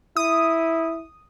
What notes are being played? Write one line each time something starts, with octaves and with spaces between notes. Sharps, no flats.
E4 D#6